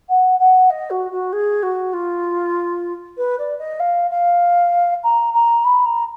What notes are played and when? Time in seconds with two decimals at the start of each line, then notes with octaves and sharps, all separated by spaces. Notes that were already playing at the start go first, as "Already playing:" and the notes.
0.08 F#5
0.39 F#5
0.70 D#5
0.90 F#4
1.11 F#4
1.32 G#4
1.62 F#4
1.93 F4
3.17 B4
3.38 D5
3.58 D#5
3.79 F5
4.10 F5
5.03 A#5
5.33 A#5
5.64 B5
5.85 A#5